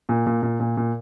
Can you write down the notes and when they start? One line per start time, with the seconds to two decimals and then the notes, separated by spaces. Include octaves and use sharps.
0.09 A#2
0.26 A#2
0.42 A#2
0.60 A#2
0.77 A#2